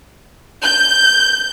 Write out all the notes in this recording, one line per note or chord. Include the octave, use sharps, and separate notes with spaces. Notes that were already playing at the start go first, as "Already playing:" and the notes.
G6